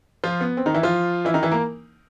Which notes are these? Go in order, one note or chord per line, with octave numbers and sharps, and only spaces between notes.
F3 F4
B3
C4
D#3 D#4
E3 E4
F3 F4
E3 E4
D#3 D#4
E3 E4
A#3 A#4